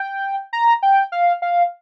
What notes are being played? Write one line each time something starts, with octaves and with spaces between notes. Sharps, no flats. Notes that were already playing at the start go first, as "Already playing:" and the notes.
Already playing: G5
A#5
G5
F5
F5